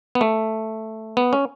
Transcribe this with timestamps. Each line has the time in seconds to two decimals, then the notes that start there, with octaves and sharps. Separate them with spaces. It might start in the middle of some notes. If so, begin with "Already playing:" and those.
0.15 B3
0.21 A3
1.17 B3
1.33 C#4